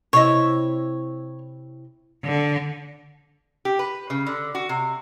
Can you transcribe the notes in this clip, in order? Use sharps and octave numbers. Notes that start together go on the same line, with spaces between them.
C3 E4 C#5 D#5
D3
G4
B4
C#3
D3
F#4
C3